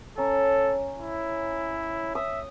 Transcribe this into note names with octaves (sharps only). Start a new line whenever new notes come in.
C#4 A4 A#5
E4
E5 D#6